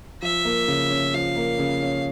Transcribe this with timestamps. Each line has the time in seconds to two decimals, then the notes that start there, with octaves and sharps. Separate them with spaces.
0.22 F3 E5
0.45 A#3
0.68 C#3
0.90 C#4
1.14 F3 F5
1.36 A#3
1.59 C#3
1.83 C#4